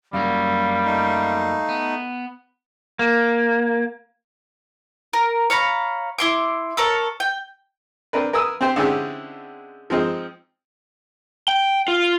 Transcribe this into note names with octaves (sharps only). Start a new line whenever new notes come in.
F#2 F#3 G3 A#3 F5
A3 D#4
B3
A#3
A#4
C#5 F5 A#5 B5
E4 C6 D6
A4 A#4 C#5
G5
C4 D4 A#4 B4
A#4 B4 G#5 D#6 E6
C4 G4 C5 G5
D3 G#3 C4 C#4 E4 G4
F3 G#3 C4 D#4
G5
F4